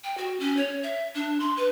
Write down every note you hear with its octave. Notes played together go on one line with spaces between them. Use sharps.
G5
F#4
C#4
C#5
E5
D4
C6
B4